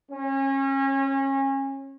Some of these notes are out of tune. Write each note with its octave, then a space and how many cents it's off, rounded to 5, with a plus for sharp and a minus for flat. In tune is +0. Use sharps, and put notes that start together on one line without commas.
C#4 -30